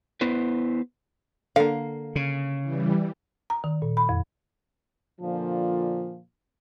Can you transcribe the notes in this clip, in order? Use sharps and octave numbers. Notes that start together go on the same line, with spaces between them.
B3 E4 B4 C5
D3 A#3 F5
C#3
E3 G3
A#5
D#3
A#2
B5
F2
A#2 D3 F3